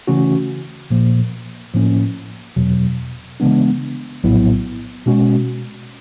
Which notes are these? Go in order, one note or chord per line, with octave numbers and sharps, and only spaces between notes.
C#3 E3 A3 C#4 F#4
A#2 F3 A#3
A2 F3 A#3 C#4
E2 B2 F#3
C#3 E3 G#3 B3 D4
A#1 A2 F#3 B3 E4
B2 G#3 C#4 F#4